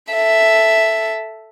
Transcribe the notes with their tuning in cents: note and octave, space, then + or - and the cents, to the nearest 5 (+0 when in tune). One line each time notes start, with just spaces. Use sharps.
A4 +0 E5 +0